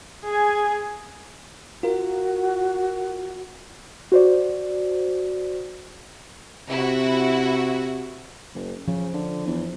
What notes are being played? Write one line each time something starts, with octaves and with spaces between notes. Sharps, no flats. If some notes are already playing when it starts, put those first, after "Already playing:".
G#4 G#5
F4 F#4 A#4
F#4 C5 D5
C3 E4 F#4
F#1
C#3 F3
D3
E2